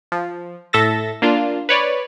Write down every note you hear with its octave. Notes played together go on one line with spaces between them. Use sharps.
F3
A2 A4 E5 A6 A#6
A#3 D4 F4
B4 C#5 D5